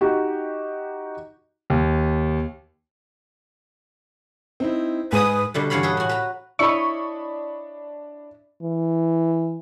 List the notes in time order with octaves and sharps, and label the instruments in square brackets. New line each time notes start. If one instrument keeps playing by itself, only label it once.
[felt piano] D#4 F#4 G4
[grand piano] D#2
C4 D#4 E4
[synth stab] G#2 D#6 [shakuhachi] B4 [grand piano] G#5
[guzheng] B2 D3 G3 A3
G2 E3 B3 C#5 F5 B5
G#4 A4 B4
A2 F#4
B4 A#5
[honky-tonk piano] D4 B5 [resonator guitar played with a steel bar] E4 C#5 D#5 [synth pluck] C#6
[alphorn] E3